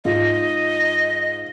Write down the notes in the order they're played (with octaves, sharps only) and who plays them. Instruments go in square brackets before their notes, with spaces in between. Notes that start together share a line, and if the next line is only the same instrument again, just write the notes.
[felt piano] G#2 F4 [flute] D#5